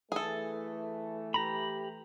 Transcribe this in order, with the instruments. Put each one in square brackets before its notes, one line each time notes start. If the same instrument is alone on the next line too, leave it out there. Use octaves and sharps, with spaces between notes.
[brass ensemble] E3 A3 [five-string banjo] G#4 A4
[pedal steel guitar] G4 A#5 B5